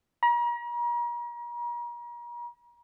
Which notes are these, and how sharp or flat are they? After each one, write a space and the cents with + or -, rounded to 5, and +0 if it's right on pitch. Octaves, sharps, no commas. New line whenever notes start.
A#5 +40